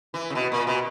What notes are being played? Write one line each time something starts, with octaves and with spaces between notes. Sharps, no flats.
E3
C#3
B2
A#2
B2